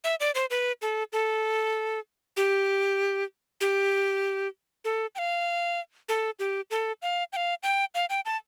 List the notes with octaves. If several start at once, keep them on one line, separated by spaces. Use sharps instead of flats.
E5
D5
C5
B4
A4
A4
G4
G4
A4
G5
F5
A4
G4
A4
F5
G5
F5
G5
F5
G5
A5